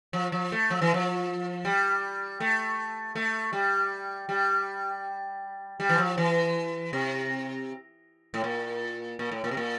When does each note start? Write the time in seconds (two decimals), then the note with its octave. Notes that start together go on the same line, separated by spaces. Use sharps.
0.13 F3
0.32 F3
0.52 A3
0.70 F3
0.82 E3
0.94 F3
1.65 G3
2.40 A3
3.15 A3
3.53 G3
4.29 G3
5.80 G3
5.89 E3
5.98 F3
6.18 E3
6.93 C3
8.34 A2
8.44 A#2
9.19 A#2
9.32 A2
9.44 A#2
9.51 C3
9.57 A#2